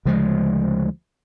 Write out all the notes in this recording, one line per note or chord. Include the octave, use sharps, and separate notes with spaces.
D2 C#3 F3 G#3